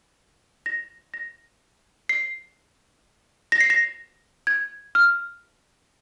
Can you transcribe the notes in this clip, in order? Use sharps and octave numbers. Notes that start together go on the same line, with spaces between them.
A#6
A#6
C7
A#6
C7
A#6
G#6
F6